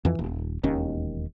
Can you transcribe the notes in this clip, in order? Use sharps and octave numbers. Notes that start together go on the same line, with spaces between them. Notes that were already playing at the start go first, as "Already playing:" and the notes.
F2 E3
D#1
E1 D#2 D#3 C#4